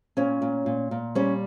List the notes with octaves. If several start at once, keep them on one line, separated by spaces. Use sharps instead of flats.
A#2 C#4 C#5
A#2
A#2
A#2
G3 C#4 C#5